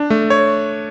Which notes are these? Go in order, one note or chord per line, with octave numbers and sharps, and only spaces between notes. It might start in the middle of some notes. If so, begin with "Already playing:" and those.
Already playing: D4
A3
C#5